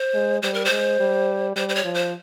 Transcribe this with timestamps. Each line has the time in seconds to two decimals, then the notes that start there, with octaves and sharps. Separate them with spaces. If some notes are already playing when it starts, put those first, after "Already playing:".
Already playing: C5
0.14 G#3
0.43 G3 C5
0.54 A#4
0.65 C5
0.71 G#3
1.00 G3
1.56 G3 C5
1.69 C5
1.75 C#5
1.84 F3
1.94 C5